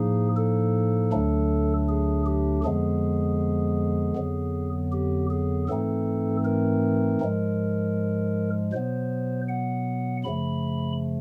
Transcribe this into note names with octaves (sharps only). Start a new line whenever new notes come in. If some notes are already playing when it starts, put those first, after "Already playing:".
Already playing: A2 F3 A#3 D#4 G#4
A4
D2 D3 F#3 A3 D4
G#4
G4
F2 D3 F3 G#3 B3 G#4
F2 D3 F#3 B3
G4
G#4
G#2 E3 A3 C4 D#4 A4
A#4
G#2 F3 G#3
B2 F#3 B3 C5
F#5
F#2 C#3 F3 A3 B5